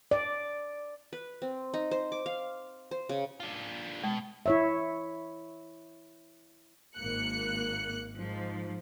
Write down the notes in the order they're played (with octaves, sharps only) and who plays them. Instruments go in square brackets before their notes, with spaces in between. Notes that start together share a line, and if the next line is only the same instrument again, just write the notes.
[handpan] D5
[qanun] B4
C4
D#4
C5
D6
F5
C5
C#3
[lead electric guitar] D4 F4
[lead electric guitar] B2 [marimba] G#3
[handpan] E4 C#5 E5
[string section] G#1 A#3 F#6 C#7
G#2 F3